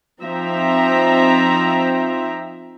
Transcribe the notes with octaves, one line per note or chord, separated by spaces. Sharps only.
F3 C4 D#4 E5 A#5